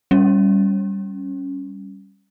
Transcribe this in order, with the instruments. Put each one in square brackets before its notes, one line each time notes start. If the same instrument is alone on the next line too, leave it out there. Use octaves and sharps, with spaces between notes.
[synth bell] G3 C#4